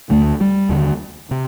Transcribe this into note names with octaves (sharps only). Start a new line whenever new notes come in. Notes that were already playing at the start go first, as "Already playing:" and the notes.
D2 D3 A3
G3
D#2 D3
C3